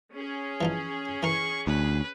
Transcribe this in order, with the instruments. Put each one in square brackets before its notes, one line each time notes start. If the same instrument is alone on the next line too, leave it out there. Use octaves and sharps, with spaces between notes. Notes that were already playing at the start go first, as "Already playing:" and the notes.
[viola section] C#4 G#4
[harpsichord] E3 F3 D#4
[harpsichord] E3 A#4 [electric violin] C#6
[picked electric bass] D2 [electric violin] B4